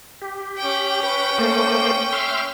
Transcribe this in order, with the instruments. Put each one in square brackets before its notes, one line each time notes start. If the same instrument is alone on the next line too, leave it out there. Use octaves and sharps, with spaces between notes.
[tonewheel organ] G4
[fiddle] C#4 G5
[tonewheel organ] B4
A3 A#3 C5
E5 C6 F6